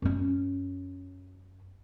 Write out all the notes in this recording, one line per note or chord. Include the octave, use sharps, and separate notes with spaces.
F#2 C#4